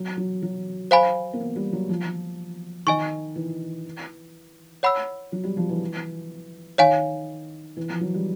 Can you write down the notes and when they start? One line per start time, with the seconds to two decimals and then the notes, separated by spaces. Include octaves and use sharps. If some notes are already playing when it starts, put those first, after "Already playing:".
Already playing: F#3
0.17 F#3
0.42 F#3
0.91 C5 F5 G#5 B5
1.33 A#3
1.40 B3
1.56 G3
1.73 F#3
1.89 F3
2.87 D#3 D#5 G#5 C#6
3.36 E3
4.83 C#5 F#5 B5 E6
5.32 F#3
5.44 G3
5.57 F3
5.69 E3
6.78 D#3 C#5 F5 G#5
7.77 E3
7.90 F3
8.01 F#3
8.14 G3